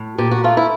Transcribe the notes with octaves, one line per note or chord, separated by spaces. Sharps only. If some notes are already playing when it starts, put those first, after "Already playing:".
Already playing: A2
A#2 G4
F#4
A3 F4
E4